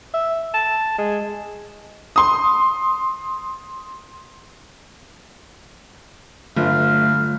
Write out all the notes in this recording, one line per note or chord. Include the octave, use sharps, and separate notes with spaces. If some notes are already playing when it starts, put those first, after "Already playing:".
E5
A5
G#3
C6 D#6
G1 D3 F#3 A3 F4 F5